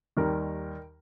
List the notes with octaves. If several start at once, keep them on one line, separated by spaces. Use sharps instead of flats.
D#2 D#3 G3 A#4